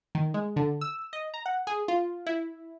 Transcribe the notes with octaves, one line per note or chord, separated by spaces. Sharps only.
D#3
G#3
D3
E6
D#5
A#5
F#5
G#4
F4
E4